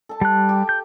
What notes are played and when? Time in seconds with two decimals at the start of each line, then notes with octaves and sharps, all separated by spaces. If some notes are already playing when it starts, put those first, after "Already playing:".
0.09 A4 A5
0.21 G3 F#6
0.49 G4 D6
0.69 G6